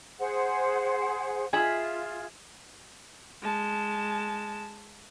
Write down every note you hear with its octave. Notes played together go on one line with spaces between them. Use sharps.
G#4 C5 F#5
F4 G#4 E5 B5
G#3 A5